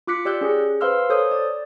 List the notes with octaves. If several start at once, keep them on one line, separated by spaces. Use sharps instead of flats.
F4 D6 F#6 B6 C#7
G4 D5 E6 F#6 G6
C#4 G#4
B4 C5 F5 C6 E6 F6
A4 C5 C#5 D#6 G6
D5